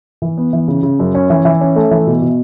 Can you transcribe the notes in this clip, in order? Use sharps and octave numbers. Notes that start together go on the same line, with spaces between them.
E3
B3
E3
C#3
C#3
F#2
C#4
E3
E3
C#4
A3
E3
B2
B2